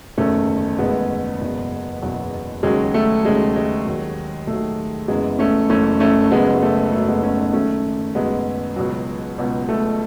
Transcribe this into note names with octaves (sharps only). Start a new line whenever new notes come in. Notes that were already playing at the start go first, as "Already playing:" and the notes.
F#1 E2 D#3 A3 C#4
F#1 E2 D#3 G#3 B3
F#1 E2 B2 F#3
F#1 E2 B2 F#3
D#2 C#3 F#3 G#3
A3
D#2 C#3 F#3 G#3
G#3
D#2 D#3 F#3
D#2 D#3 F#3 A3
F#1 F#2 E3 G#3 B3
A3 C#4
F#1 F#2 E3 A3 C#4
A3 C#4
F#1 F#2 C#3 F#3 G#3 B3
G#3
A3
F#1 F#2 C#3 F#3 A3
G#3 B3
A3 C#4
B3 D#4
F#1 F#2 D#3 F#3 A3 C#4
F#1 F#2 D#3 F#3 G#3 B3
C#2 B2 F#3
C#2 B2 F#3
A3